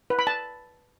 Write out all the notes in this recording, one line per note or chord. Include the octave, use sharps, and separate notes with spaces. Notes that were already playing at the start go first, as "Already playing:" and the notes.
B4
B5
A5